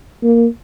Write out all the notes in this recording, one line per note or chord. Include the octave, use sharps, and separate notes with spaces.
A#3